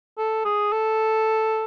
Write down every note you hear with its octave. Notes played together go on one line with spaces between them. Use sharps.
A4
G#4
A4